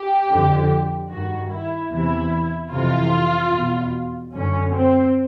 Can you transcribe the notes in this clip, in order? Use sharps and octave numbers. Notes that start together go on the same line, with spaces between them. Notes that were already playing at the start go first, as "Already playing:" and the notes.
Already playing: G4
F2 D3
G2 D#3 F#4
E4
E2 C3 E3 E4
F2 C3 E3 F4
E2 B2
F#2 D3 C#4
C4